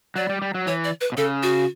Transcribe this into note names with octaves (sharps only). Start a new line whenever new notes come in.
F#3 D5
G3
G3
F#3
E3 C#5
D5
B4
B2
C#3 A4
F#4